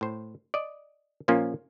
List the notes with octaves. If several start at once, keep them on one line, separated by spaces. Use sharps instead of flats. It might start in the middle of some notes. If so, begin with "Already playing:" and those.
A2 C5
D5 D#5
A#2 F3 A#3 C#4 F4